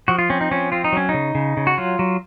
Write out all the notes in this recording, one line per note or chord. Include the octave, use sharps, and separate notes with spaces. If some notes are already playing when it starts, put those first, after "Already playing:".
F3 F#4
F4
C4 C#4
D#4
F3 C#4
C4 F4
D#4
F#3 C#4
D#4
C#3
C#3
C#3
F#4
F#3 F4
F#3